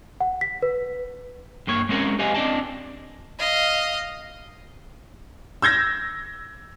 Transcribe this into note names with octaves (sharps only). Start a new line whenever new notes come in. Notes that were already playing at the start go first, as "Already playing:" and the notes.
F#5
B6
B4
G2 A#3 C#5
G#3 C4 C#4 A#4 C#5
G4 B4 D#5 F5 G#5
C4 D4 D5 D#5 A5
D#5 F5
E6 G6 G#6 A#6